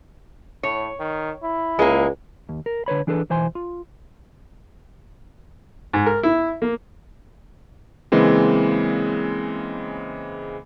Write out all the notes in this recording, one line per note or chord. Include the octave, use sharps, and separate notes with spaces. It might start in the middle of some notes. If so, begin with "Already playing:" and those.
A2 C#5
D#3
E4
C#2 G#3 A#3
D#2
A#4
D3 B4 C#5 B5
E3 D4 G#4 A4 B4
B1 E3 C5 G#5 C6
F4
G#2
A#4
E4
A#3
C#3 E3 G#3 A#3 C4